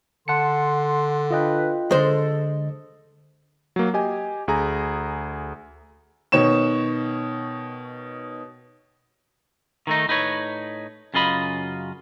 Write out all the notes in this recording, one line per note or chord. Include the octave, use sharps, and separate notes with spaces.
D3 F#5 A5 C6 C#7
D4 F4 B4 D#5 G5
D3 G#3 A4 C5 D#5
F#3 A#3
G4 D#5 G#5
D2 G#4 A#5
B2 D#3 C#5 C#6 E7
D#3 A3 D#4
A2 D#4 B4 C#5
F#2 C#3 F4 D#5 B5